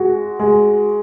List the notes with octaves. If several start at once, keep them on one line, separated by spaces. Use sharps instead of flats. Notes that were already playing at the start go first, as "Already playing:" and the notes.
Already playing: G#3 F#4
G#3